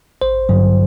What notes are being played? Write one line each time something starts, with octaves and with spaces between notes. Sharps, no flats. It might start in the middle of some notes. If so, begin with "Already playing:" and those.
A1 C5
G2 D3 F#3